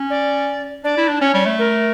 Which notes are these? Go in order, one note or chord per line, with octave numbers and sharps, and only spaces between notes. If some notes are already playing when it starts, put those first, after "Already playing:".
Already playing: C#4
D5
D4 D5
E4
D4
C#4 C#5
G3
A3
A#4